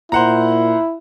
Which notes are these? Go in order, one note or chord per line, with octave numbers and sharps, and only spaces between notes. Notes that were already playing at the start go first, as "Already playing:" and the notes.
A#2 E4 C5 F#5 A#5